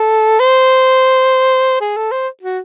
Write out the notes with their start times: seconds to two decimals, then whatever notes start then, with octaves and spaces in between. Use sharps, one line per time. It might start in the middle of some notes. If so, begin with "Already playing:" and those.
Already playing: A4
0.40 C5
1.81 G#4
1.97 A4
2.11 C5
2.43 F#4